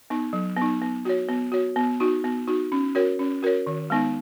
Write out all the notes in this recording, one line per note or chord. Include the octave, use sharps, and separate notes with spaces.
B3 D#4
F#3
B3
D#4
B3
F#4 C#5
B3
F#4 C#5
B3
D#4 F#4
B3
D#4 F#4
C#4
F#4 A#4 C#5
C#4
F#4 A#4 C#5
D#3
G#3 B3 D#4